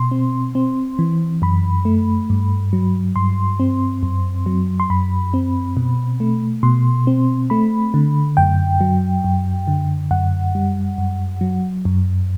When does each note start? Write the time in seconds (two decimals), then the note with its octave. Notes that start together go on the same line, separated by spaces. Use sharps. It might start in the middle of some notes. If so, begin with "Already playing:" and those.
Already playing: B2 C6
0.11 C4
0.55 C4
0.99 E3
1.42 F#2 B5
1.85 A3
2.30 G2
2.73 F#3
3.16 G2 C6
3.60 C4
4.03 F#2
4.46 F#3
4.80 C6
4.90 F#2 B5
5.34 C4
5.77 B2
6.20 A3
6.63 B2 C6
7.07 C4
7.50 A3 B5
7.94 D3
8.37 F#2 G5
8.81 F#3
9.24 F#2
9.68 D3
10.11 F#2 F#5
10.55 G3
10.98 F#2
11.41 F#3
11.85 F#2